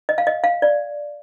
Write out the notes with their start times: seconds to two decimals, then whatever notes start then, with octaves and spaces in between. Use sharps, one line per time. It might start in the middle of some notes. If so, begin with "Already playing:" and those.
0.09 D#5
0.18 F5
0.27 D#5
0.44 F5
0.62 D5